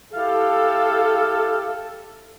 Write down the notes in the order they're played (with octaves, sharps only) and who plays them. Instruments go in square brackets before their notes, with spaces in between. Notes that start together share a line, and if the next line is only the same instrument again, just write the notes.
[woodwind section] E4 G4 F5 [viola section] A4